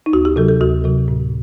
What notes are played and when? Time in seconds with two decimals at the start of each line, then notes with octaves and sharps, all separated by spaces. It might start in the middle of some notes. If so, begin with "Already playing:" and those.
0.06 D#4
0.13 D2 F#4
0.25 G4
0.36 C3 F#3 A4
0.48 A4
0.60 D2 F#4
0.84 C3 F#3
1.08 A2